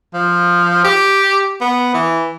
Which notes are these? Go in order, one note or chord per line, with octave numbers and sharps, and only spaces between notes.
F3
G4
B3
E3